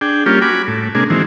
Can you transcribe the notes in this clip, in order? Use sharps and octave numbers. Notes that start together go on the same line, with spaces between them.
D4 G#4 G5
G3 A#3 C#4 F4 G4
F#4 G#5 B5 D6
A2
C3 G#3 A#3 D4 G#4
D#3 E3 F#3 G#3 C4